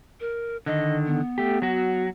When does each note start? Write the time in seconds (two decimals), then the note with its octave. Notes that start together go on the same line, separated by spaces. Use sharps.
0.20 A#4
0.66 D3 D#3 D#5
1.06 B3
1.38 A3 G4
1.62 F#3 F#4